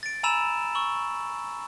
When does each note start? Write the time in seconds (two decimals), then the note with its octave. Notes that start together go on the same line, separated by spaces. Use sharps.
0.03 A6 D7
0.23 G#5 A#5 B5 E6 E7 F7
0.75 C#6 E6 F#7